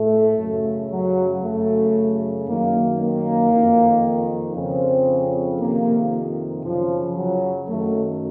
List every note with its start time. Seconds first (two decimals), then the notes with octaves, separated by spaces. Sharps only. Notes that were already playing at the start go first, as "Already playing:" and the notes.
Already playing: A2 A3
0.38 F#2 C#3
0.90 F#3
1.43 F#2 C#3 A3
2.46 F#2 D#3 A#3
2.99 A#3
3.51 F2 D#3
4.56 F2 C#3 C4
5.60 F2 C3 D#3 A#3
6.64 F#2 C#3 F3
7.16 F#3
7.67 F#2 D#3 A3